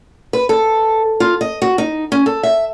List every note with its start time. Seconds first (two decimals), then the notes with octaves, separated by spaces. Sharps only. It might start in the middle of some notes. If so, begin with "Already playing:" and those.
0.33 B4
0.49 A4
1.20 F4
1.41 D#5
1.62 F#4
1.78 D#4
2.12 C#4
2.26 A4
2.43 E5